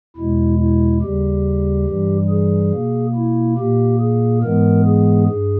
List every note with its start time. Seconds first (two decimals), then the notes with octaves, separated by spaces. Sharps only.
0.16 E2 B2 G#3 E4
0.59 E4
1.02 D#2 C#3 G3 G4
1.87 G2 E3 G3
2.30 G#4
2.72 B2 A#3
3.15 E4
3.57 A#2 A#3 G4
4.00 G#4
4.43 G#2 E3 G#3 B3 A#4
4.85 G#4
5.28 G2 G#4